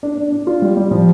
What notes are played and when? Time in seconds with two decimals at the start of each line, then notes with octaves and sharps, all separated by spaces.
0.03 D4
0.18 D4
0.32 D4
0.47 F4
0.62 G3
0.77 G3
0.91 F3